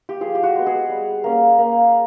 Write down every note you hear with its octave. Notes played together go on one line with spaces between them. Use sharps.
G4
F3 G#4
G4
F#4
G#3 B3
G#4
G3
A#3 C#4
A#3